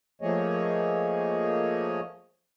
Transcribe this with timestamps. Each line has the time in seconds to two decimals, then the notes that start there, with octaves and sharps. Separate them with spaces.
0.22 F3 A3 A#3 G#4 C#5 D#5